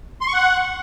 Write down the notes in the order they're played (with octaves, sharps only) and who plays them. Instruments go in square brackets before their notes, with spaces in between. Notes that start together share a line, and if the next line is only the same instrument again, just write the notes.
[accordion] C6
C#6
F#5